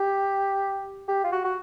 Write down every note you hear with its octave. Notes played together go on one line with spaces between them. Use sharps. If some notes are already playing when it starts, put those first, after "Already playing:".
Already playing: G4
G4
F4
F#4
F#4